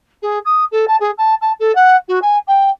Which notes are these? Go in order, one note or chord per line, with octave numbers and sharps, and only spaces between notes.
G#4
D#6
A4
A5
G#4
A5
A5
A4
F#5
F#4
G#5
G5